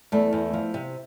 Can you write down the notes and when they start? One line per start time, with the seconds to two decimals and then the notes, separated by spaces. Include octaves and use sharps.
0.12 E2 A3
0.33 E2
0.53 F3
0.74 C3